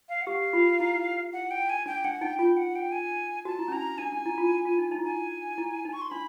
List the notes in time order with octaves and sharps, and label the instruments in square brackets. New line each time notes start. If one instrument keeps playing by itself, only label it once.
[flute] F5
F#5
[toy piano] G4 [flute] F5
[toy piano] F4
E4
[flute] F#5
G5
G#5
[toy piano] D4 [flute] G5
[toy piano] D4 [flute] F#5
[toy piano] D#4 [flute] G5
[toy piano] F4 [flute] G5
[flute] F#5
G5
G#5
[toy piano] F#4 [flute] A5
[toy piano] E4
C#4
[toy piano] D4 [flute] A#5
[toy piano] D4 [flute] G#5
[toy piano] D4
E4
F4
F4
D#4
D#4
E4
[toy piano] D#4 [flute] G#5
[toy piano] E4
D#4
[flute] C#6
C6
[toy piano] D4 [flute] B5